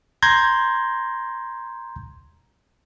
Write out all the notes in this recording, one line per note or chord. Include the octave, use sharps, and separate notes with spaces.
A#5 C6 G6 G#6 A#6